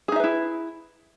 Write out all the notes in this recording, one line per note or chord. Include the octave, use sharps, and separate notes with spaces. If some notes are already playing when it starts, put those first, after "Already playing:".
D#4 E4 G#4 B4 E5